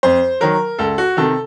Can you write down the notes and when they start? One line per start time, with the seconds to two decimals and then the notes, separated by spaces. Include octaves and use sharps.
0.03 F2 C5
0.41 D#3 F#3 A#4
0.79 C#2 A4
0.98 F#4
1.17 C3 D#3 A4